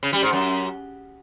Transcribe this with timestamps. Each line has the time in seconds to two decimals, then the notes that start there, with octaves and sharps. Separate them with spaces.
0.03 C#3
0.13 G3
0.23 G#2
0.33 F#2